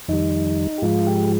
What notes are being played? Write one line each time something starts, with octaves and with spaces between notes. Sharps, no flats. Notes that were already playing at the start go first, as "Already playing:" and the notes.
F2 D#3 G3 D#4
G4
G#2 F3 G#3 F4
G4